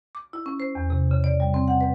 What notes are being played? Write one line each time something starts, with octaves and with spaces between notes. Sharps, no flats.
D6
E4
C#4
C5
E2
C3
C#3
D5
G3
C4
F#5
B4